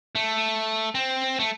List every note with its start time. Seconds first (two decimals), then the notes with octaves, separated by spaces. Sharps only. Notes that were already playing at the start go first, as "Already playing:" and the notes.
0.15 A3
0.95 C4
1.39 A3